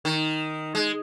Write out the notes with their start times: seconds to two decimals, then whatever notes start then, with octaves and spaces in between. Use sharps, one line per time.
0.05 D#3
0.75 G#3